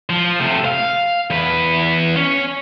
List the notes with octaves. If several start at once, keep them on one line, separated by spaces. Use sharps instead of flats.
F3
C3 A3
F5
E2 B4
C#4